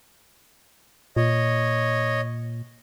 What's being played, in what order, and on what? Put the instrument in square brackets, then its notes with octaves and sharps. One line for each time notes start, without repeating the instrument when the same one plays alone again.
[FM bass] A#2 [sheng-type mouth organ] C#5 D#5